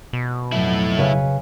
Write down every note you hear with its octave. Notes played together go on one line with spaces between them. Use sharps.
B2
F2 F#3 A3 E4
C#3 B4 G#5